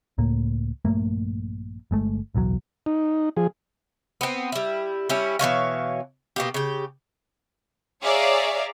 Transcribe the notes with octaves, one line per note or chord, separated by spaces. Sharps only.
C#2 A2 A#3
A#1 G2 A3 A#3
G1 G#3 A3
D1 B1 E2 F#3
D#4
F3 G#4
B3 C4
G3 E4
G3 C#4 E4
B2 E3 C#5 F5
B2 A#3 G4
C#3 G4
G#4 C#5 D5 E5 F5 A#5